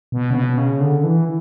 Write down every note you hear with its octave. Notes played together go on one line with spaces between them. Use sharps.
B2
C#3
B2
C#3
D3
E3